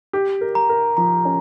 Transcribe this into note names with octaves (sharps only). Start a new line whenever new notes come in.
G4
A#4
A#5
A#4
F3 A#5
C#4